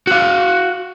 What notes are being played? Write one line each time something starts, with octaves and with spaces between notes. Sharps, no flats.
F#4 F5